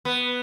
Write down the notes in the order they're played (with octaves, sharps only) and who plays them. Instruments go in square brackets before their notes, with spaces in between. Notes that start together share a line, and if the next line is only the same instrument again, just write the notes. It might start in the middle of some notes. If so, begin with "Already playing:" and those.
[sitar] B3